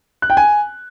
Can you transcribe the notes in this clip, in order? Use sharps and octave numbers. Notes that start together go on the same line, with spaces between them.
F#6
G5
G#5